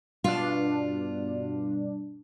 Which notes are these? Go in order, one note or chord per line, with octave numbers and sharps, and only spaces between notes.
G2 B2 D4 F4